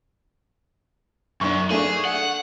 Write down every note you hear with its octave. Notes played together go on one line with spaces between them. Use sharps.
F#2 D4 C#6
A3 D4 G#4
F#5